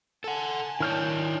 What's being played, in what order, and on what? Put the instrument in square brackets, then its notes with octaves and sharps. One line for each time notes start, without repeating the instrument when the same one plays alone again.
[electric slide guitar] A4 F#5 [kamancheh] G#5 A5
[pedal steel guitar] D#3 F6 G6 [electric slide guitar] E4 C#5 D5